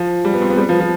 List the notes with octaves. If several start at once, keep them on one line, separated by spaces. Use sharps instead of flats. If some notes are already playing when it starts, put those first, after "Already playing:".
Already playing: F3
G3
B3
C4
B3
G3
F3
F3